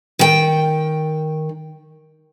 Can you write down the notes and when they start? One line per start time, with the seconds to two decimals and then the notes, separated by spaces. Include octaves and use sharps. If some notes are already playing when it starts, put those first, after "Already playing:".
0.19 D#3 G5